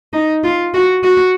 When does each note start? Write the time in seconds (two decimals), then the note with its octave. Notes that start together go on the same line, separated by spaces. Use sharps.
0.13 D#4
0.44 F4
0.74 F#4
1.04 F#4